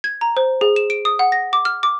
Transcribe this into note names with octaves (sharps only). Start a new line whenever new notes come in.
G#6
A#5
C5
G#4
E7
D7
D#6
F#5
A#6
D6
F6
D6